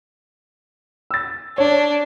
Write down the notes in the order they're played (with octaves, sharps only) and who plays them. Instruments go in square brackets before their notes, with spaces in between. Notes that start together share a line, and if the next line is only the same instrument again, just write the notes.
[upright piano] E6 A6
[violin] D4 [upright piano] C#5